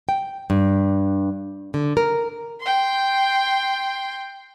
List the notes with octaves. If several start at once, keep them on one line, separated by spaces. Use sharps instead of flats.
G5
G2
D3
A#4
G5 C6